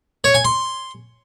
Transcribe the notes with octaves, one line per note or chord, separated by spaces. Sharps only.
C#5
G#5
C6